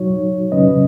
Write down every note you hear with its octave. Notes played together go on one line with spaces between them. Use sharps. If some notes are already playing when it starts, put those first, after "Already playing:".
Already playing: F#3 D#4 F#4 C#5
C#3 F#3 C#4 B4 D#5